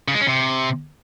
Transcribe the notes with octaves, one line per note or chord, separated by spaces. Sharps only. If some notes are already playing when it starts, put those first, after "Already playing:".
C#3
G#3
C#4
C3